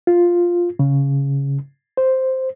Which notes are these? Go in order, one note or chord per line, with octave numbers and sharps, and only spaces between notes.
F4
C#3
C5